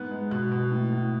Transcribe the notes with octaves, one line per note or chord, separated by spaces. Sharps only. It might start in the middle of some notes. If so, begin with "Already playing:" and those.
Already playing: G#2 B3 F#6
G#3
B2 F#6
B2
A2
A2